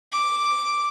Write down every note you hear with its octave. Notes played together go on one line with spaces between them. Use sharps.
D6